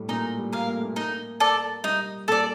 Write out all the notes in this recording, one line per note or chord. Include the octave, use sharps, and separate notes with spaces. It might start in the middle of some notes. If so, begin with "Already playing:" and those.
Already playing: A2 G3
A#2 D#4
G3
A#4 F5
A#3
A3
A#3
D#4
A4 D5
G3 D#4
A#2 A4 D5